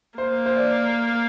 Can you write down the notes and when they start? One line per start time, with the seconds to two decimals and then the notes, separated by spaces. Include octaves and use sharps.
0.18 A#3 C5
0.46 C5
0.57 D5